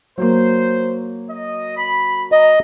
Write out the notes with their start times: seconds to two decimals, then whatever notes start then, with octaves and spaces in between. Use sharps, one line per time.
0.18 F#3 A#3 C5
1.29 D#5
1.77 B5
2.32 D#5 A#5